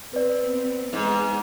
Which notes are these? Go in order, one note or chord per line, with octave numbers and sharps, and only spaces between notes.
B3 C4 B4 D5
E2 G#2 G#3